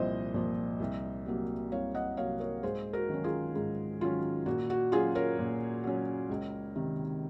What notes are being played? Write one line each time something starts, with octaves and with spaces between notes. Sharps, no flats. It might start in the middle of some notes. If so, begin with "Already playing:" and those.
Already playing: C2 A#2 F3 C5 D#5
A#2 F3
C2
C3 F#3 A#3
C2 C#5 F5
D#5 F#5
C3 F#3 A#3 C#5 F5
A#4 C#5
G#2 G#4 C5
F#4 A#4
D#3 F#3 C#4
F4 G#4
G#2
D#3 F#3 C#4 F4
A#2 F#4
F#4
F#3 C#4 F4 G#4
A#4 C#5
A#2
F#3 C#4
C#2
C3 D#3